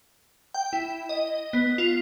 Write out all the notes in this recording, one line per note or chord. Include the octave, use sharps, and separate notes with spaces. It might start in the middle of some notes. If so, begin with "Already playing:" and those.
G5
E4
D#5
B3
F4